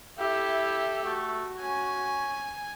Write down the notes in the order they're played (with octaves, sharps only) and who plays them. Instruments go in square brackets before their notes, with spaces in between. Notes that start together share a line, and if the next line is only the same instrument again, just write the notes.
[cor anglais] E4 [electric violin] G4 A4 [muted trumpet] E5
[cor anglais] A3 [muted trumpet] F#4
[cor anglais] C#4 [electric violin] G#5